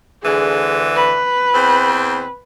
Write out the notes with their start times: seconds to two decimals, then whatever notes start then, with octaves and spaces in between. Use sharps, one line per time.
0.23 D2 D3 E3 G#4
0.95 B4
1.54 E2 C4